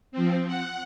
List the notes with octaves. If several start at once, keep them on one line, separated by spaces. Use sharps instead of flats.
F3 C4
F#5